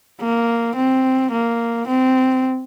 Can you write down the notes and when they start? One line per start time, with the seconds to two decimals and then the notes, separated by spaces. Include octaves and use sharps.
0.21 A#3
0.76 C4
1.32 A#3
1.88 C4